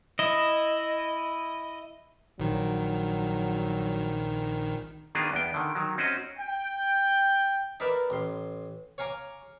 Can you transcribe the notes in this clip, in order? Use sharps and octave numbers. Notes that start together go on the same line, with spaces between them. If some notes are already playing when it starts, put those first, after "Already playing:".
E4 D#5
A#1 D#3 F#3
D#3 A#3 B3 D4 F4 G#4
E2 B3 G5
D3 D#3
D#3 F#3
C4 C#4 F#4 D#5
G5
D#4 E4 A#4 B4 D5 E5
A1 C6
C#5 F5 G#5 A#5 D6